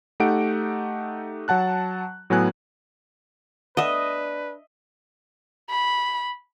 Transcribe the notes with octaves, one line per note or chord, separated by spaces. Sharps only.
A3 D#4 G4 F#5 D7
F#3 F#5 A5 F#6
A2 F#3 B3 G#5 F#6
A3 B3 D4 B4 D#5 E5 F#5
B5